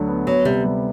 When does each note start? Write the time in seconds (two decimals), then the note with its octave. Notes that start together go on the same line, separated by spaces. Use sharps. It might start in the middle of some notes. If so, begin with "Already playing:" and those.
Already playing: D2 D3 F#3
0.08 B3
0.27 F#3 B3
0.45 C3 G3
0.64 G3